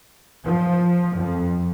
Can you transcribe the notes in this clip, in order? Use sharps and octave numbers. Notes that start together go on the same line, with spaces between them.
F3
F2